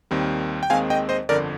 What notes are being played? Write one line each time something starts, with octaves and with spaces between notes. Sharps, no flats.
D#2 D#3 G3 C4
G5
D#2 D#3 G#3 C4 F5 G#5
D#5 G5
C5 D#5
G1 F2 D3 A#4 D5